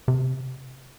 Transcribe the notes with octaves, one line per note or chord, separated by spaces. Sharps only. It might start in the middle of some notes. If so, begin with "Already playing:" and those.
C3